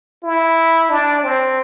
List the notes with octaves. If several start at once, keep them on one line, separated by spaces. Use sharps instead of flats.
E4
D4
C4